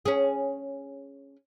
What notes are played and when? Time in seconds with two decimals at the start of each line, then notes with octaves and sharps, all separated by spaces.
0.05 C#4 G#4